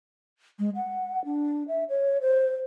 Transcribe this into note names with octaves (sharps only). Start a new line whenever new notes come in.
G#3
F#5
D4
E5
C#5
C5